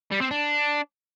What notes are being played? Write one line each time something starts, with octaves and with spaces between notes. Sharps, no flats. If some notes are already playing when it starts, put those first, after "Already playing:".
G3
C4
D4